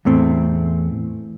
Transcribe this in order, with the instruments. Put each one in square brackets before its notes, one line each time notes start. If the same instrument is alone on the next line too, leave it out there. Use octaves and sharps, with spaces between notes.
[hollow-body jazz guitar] E2 A2 A3 C4